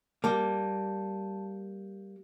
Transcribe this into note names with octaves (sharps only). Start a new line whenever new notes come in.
G3 A#3 A5